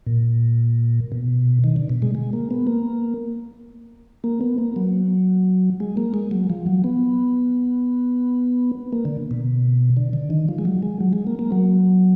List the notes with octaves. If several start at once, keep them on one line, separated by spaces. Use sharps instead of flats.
A#2
B2
D#3
D3
B2
G#3
G#3
A#3
B3
A#3
A#3
B3
A#3
F#3
G#3
A#3
G#3
F#3
F3
F#3
B3
A#3
D3
B2
D3
D3
D#3
F3
G#3
F#3
G#3
F#3
G#3
A#3
A#3
F#3